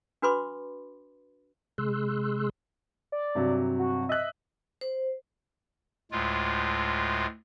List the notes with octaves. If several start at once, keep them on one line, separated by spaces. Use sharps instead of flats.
D4 F#4 B4 B5 C6 D6
C3 G#3 G#4 C6 E6 F#6
D5
G2 C3 F#3
F#4
D#5 E5 F#6
C5
D2 A2 G#3 F4